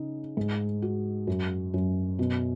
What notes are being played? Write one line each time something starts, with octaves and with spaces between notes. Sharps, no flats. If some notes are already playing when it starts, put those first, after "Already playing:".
Already playing: C#3 D#4
G#2
F#4
F#2
F#2
B2